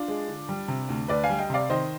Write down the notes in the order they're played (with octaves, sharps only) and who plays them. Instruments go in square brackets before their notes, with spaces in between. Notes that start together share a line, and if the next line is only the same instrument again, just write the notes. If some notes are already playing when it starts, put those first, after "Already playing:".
Already playing: [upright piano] D4 F4
G#3
D3
G3
C3
D2
D2 B4 D5
F5 G#5
G3
D#5 G5
C3 D5 F5
D#3 C5 D#5